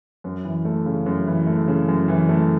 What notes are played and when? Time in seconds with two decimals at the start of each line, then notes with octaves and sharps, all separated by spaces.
0.24 F#2
0.45 E3
0.65 A3
0.86 C#3
1.06 F#2
1.27 E3
1.47 A3
1.68 C#3
1.88 F#2
2.08 E3
2.29 A3